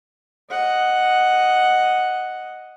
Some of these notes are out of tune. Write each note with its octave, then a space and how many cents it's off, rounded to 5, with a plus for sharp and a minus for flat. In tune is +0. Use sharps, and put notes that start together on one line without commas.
D#5 +0 F#5 +0